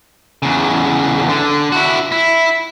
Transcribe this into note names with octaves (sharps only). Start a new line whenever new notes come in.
E2 C#3
D3
E4 F#4
E4